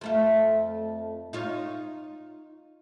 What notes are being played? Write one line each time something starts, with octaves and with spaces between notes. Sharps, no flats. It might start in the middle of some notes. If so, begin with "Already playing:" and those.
F2 A3 F4
D#4 F4 C#5